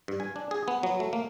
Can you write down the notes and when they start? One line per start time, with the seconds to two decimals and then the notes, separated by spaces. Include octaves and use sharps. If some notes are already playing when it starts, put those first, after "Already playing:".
0.08 G2
0.20 G#5
0.36 D4
0.51 G#4
0.68 B3
0.83 F#3
1.00 A3
1.13 A#3